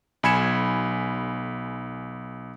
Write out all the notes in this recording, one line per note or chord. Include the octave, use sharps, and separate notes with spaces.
B1 G#5 B5 G#6 C#7 E7